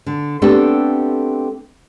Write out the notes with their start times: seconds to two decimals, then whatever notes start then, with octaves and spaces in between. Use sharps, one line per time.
0.06 D3
0.42 A3 B3 C4 D4 G4 A4